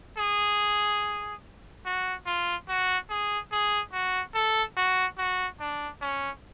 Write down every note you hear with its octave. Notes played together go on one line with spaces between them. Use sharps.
G#4
F#4
F4
F#4
G#4
G#4
F#4
A4
F#4
F#4
D4
C#4